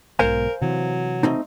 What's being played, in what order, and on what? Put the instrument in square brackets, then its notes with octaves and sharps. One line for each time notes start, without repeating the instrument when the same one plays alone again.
[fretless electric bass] B1 G#2 B2 [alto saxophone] A#4 [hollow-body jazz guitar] C5 F5 G#5
[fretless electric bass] C3 E3 [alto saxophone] F#3
[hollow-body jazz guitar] A3 C4 D#4